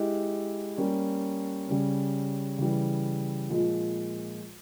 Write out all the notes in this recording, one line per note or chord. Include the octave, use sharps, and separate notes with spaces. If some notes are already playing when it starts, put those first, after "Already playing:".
Already playing: G#3 E4 G4
G3 A#3 C#4
C#3 G3 C#4
C#3 E3 G3
A#2 F3 G#3